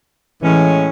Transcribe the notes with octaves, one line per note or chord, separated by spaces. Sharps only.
A2 E3 G#3 C#4